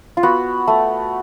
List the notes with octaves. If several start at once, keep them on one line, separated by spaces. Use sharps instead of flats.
F4
B3 F#4
A3